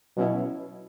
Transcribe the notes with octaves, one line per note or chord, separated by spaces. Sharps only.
B2 F#3 C#4 E4